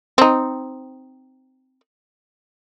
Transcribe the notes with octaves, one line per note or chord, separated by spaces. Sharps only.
C4 D#4